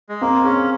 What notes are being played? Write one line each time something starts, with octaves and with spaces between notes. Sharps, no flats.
G#3
A#3 C4
C#4 G#4